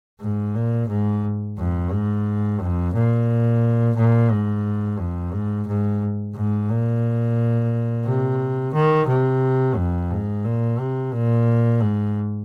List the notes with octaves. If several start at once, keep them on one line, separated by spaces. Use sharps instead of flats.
G#2
A#2
G#2
F2
G#2
F2
A#2
A#2
G#2
F2
G#2
G#2
G#2
A#2
C3
D#3
C3
F2
G#2
A#2
C3
A#2
G#2